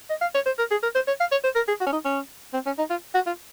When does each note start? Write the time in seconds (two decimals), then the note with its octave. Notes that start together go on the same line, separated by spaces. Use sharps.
0.10 D#5
0.22 F5
0.35 C#5
0.46 C5
0.59 A#4
0.71 G#4
0.83 A#4
0.95 C5
1.08 C#5
1.20 F5
1.32 C#5
1.44 C5
1.56 A#4
1.68 G#4
1.81 F#4
1.87 C#4
1.93 D#4
2.05 C#4
2.54 C4
2.66 C#4
2.78 D#4
2.90 F4
3.14 F#4
3.27 F4